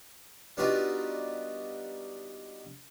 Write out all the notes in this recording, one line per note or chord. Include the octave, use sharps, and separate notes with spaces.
G3 B3 D4 D#4 F4 F#4